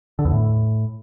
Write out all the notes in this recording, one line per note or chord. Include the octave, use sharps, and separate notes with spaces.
D3
E2
A2